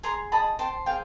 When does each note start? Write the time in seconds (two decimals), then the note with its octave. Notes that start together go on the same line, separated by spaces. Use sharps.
0.03 G#4 A#5 C6
0.32 D#5 A5 B5
0.59 C5 G5 A5
0.86 G#4 F5 G5